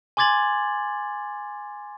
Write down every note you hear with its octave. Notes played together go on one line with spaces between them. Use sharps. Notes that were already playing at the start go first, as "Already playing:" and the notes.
G#5 C6 D6 G#6 A6 F#7